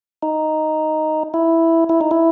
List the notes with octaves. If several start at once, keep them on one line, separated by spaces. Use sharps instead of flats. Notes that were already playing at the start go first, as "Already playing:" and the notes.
D#4
E4
E4
D#4
E4